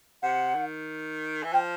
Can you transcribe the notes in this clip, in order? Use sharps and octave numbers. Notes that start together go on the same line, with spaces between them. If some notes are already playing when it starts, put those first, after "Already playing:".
C3 F#5
D#3
E3
F3 G5